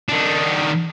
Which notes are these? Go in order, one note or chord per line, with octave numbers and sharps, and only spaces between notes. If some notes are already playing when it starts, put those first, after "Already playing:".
D#3 D4